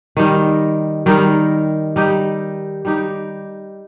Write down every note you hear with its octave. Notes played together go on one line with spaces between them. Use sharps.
D#3 G3 D#4 A#4
D#3 G3 D#4 A#4
G3 D#4 G4
G3 D#4 G4